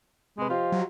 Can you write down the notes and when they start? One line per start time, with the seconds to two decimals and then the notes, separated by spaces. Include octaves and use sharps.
0.38 C3 G#3 B4
0.50 F3 F4 G4 D#5 F5
0.72 F#3